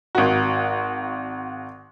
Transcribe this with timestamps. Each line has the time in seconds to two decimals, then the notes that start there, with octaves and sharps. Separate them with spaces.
0.15 G#1 F#4